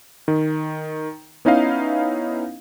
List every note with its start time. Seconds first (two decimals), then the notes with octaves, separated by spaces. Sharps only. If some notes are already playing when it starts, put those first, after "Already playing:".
0.28 D#3
1.45 B3 C#4 D#4 E4 D#5 F5